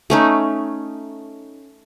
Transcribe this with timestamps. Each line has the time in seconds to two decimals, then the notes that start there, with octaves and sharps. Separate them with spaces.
0.10 A3 C#4 D#4